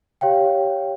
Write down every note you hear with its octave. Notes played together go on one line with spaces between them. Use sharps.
G4 C#5 F5 G5